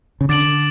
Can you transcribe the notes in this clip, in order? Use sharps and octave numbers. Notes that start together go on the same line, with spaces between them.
C#3
D3 D6 A6 D7 F#7